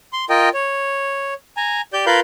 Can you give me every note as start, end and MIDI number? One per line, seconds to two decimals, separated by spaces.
0.13 0.25 84
0.30 0.49 65
0.30 0.49 70
0.30 0.49 75
0.30 0.49 79
0.54 1.34 73
1.57 1.81 80
1.57 1.81 82
1.93 2.05 67
1.93 2.05 74
1.93 2.05 91
2.06 2.20 65
2.06 2.20 70
2.06 2.20 71
2.06 2.20 77
2.06 2.20 83
2.06 2.20 91